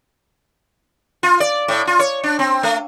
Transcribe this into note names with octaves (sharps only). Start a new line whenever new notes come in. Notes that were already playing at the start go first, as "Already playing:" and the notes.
F4
D5
A2
F4
C#5
D4
C4
A3